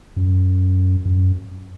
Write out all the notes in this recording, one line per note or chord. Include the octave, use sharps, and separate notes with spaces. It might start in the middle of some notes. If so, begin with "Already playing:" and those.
F#2
F#2